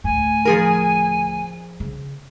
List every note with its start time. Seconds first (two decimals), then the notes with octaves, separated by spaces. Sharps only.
0.04 D2 A2 G#5
0.45 F3 G#4 A#4
1.80 C#3 D4